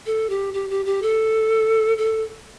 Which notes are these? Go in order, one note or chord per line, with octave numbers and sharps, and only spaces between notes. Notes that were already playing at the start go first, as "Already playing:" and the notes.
A4
G4
G4
G4
G4
A4
A4